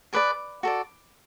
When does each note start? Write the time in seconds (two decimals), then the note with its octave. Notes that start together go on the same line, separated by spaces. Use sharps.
0.13 G#4 B4 D5 D6
0.63 F#4 A4 D5